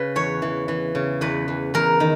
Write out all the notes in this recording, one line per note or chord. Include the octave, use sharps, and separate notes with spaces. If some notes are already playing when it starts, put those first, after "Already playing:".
Already playing: C#3 B4
E2 C#5
E3
E3
C#3
E2 B4
E2
E2 A#4
D#3